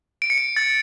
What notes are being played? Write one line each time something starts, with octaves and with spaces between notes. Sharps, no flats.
D7
C#7
D7
A6